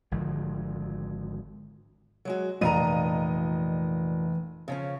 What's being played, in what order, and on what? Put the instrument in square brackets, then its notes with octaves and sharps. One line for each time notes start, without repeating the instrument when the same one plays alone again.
[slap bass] G#1 D3 F3 G#3
[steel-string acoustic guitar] F#3 G#3 F#4
[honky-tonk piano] F1 D#5 D#7 [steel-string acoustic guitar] A#2 F3 A#5 [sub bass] E3
[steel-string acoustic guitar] C#3 F3 C#4